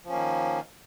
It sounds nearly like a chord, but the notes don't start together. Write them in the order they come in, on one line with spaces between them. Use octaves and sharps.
F3 C#4 A#3 D#3